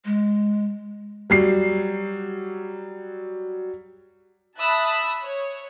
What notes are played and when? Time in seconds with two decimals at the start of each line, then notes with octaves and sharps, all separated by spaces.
0.05 G#3
1.30 F#3 G3 C7
4.60 E5 A5 B5 D#6 E6 F#6
5.22 C#5